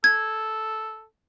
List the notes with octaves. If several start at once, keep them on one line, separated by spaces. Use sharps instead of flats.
A4 G#6